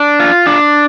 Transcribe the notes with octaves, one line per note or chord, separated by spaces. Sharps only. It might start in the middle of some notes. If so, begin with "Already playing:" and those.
Already playing: D4
F4
D4